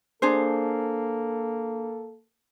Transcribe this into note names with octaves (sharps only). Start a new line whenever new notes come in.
A#3 D4 G#4 A4 C5